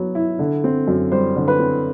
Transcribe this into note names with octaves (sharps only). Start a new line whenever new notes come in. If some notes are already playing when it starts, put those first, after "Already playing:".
Already playing: F#3 B3
E4
D3
C4
F#2
G3 C5
D3
B4
C4